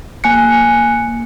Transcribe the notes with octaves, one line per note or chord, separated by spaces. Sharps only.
A#3 G#5 F#6 C#7